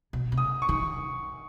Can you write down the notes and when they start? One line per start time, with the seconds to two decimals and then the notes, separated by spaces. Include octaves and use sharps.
0.13 B2
0.32 C3
0.38 D#6
0.62 C#6
0.69 D#3